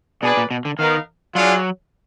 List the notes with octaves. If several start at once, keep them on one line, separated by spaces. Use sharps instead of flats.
B2 D4 G#4 B4 D5
A#2
B2
D3
D#3 B3 D#4 A#4 F5
F#3 D4 F4 G#4 D5 F#5